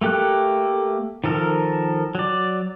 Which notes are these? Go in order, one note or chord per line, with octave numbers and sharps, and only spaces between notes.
A3 A#3 G4 A4 F#6
D#3 F3 A4 A#4
F#3 D5